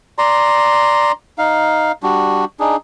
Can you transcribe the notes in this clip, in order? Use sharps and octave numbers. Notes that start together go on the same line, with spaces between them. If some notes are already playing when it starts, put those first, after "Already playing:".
D5 A#5 C6
D#4 F5
G3 D4 F#4
D4 D#4 G#4